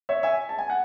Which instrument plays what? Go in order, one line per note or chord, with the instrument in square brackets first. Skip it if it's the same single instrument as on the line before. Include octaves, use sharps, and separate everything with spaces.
[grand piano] C#5 E5
E5 G#5
A5
G#5
F#5